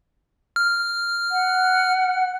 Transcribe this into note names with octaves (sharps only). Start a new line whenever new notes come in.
F6
F#5